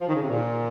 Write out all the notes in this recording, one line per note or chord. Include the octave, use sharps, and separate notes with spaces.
F3
D#3
C#3
C3
A#2